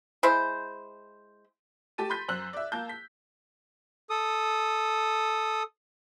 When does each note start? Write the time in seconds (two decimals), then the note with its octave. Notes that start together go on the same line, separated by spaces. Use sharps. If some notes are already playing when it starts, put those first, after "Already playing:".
0.23 G#3 E4 C5
1.98 A3 G4 A5 A6 D#7
2.10 B5 C6 G6 B6
2.28 F#2 C5 E6 F#6 F#7
2.53 D5 E5
2.72 A#3 A5 G6
2.89 B6
4.10 A4 D#6